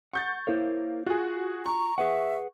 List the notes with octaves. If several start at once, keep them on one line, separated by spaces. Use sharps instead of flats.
F#5 C#6 G6 A6
A#3 E4 C5 C#5
F4 F#4 G#4
A#5 C#6
G#4 B4 E5 F#5